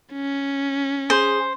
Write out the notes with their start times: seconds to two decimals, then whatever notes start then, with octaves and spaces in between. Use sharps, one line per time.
0.13 C#4
1.10 G#4 C5